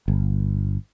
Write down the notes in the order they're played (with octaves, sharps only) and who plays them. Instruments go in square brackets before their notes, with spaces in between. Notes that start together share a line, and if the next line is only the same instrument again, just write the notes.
[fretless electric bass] G1